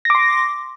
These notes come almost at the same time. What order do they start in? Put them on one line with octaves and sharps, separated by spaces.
A#6 D6 C6